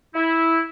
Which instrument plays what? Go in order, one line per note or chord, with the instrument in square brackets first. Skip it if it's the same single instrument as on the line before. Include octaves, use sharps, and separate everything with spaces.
[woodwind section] E4